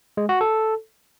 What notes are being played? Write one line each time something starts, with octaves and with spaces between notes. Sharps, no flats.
G#3
F#4
A4